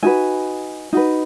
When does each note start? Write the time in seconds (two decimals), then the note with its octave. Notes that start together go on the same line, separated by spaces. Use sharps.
0.03 D#4 F#4 B4 G#5
0.93 D#4 F#4 B4